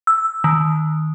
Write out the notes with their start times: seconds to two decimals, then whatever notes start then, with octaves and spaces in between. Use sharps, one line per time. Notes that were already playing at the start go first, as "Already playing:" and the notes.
0.07 E6
0.44 D#3